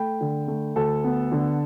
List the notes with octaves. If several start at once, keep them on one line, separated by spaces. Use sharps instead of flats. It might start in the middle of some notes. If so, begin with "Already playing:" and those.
Already playing: A3 G5 B5
D3
A3
D2 A4
B3
D3